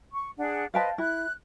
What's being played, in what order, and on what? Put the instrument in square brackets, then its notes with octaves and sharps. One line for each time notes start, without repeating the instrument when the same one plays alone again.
[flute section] C#6
D4 G#4 F#5
[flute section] B4 C5 D#5 [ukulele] F5 G5 A5
[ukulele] E4 [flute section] F#6